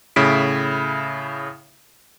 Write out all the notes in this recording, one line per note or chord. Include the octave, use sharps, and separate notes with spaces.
A2 C#3 E4 B6 D7